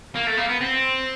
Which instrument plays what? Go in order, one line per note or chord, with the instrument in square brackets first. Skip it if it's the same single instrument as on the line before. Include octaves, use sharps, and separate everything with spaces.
[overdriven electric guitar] A#3
A3
A#3
B3
C4